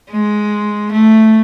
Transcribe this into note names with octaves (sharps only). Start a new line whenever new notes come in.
G#3
A3